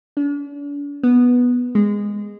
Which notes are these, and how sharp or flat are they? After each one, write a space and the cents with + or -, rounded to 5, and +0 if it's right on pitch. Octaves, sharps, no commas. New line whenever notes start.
D4 -40
B3 -5
G#3 -15